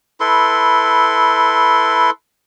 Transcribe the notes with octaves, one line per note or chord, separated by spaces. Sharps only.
E4 A4 B4 C6